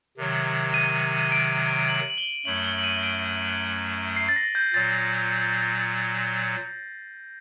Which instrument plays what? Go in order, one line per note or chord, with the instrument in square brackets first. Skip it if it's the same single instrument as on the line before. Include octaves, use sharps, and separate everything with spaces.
[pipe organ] C3 D#3 F#3
[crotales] D#7
D#7
D7
F#7
F#7
G7
[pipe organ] F#2 F#3 A3 [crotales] F#7
[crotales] G7
F#7
D#7
D7
C7
A6
A#6
G6
[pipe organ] A#2 F#3 [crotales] A6